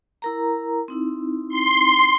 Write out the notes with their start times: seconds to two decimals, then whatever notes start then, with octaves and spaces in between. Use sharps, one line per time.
0.22 E4 A#4 A#5
0.88 C4 D#4 E4
1.49 C6